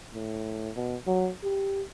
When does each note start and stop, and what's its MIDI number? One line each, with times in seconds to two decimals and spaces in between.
0.14 0.70 45
0.76 0.96 47
1.07 1.30 54
1.43 1.82 67